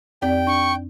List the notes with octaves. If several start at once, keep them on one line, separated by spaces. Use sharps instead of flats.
F2 C4 G4 D5 G5
D4 C#6